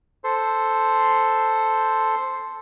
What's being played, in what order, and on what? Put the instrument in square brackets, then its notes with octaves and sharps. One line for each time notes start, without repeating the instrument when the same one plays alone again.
[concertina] A4 C5